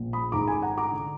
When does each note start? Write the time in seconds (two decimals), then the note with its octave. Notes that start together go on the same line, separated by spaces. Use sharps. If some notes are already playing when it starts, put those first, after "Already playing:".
Already playing: A#1 A#2
0.13 B5 D#6
0.32 G#1 G#2 D#3 A#5 D6
0.48 G#5 B5
0.62 F#5 A#5
0.77 A#5 D6
0.92 D3